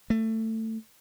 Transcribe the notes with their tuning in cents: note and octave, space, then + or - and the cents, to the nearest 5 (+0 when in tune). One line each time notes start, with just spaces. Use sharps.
A3 +20